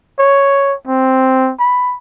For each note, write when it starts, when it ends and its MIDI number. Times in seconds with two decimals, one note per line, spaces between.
0.19 0.74 73
0.87 1.52 60
1.59 1.95 83